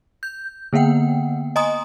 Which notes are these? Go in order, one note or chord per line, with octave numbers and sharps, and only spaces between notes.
G6
D3 A#3 B3 F#5 G5
D#5 G#5 A#5 C6 D#6